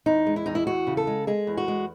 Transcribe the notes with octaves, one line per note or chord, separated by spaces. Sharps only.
E2 D#4
G#3
E4
E2 D#4
E4
E2 F#4
C#3
A4
G#3
G#3 G#4
E2
F#4
G#3